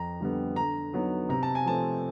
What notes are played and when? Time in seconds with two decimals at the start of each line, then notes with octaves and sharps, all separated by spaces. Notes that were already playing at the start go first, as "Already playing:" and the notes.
Already playing: F2 A#5
0.20 D3 G3 B3
0.56 D3 A#5
0.93 F#3 B3 D#4
1.29 C3 A#5
1.43 A5
1.55 G#5
1.65 F3 A3 C4 A5